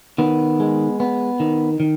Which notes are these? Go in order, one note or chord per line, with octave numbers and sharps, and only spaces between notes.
D#3 B3
G#3
B3
D#3
D#3